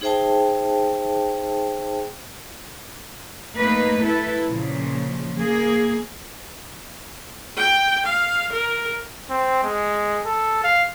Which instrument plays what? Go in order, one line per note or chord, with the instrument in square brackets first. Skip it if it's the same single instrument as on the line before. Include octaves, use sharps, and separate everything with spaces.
[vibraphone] D#4 G#4 C5 E5 G5 A5
[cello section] A3 A#3 D#4 B4
E4 A4 B4
A#2 C#3 F3
A#3 G#4
[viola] G5
F5
A#4
[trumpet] C4
G#3
A4
F5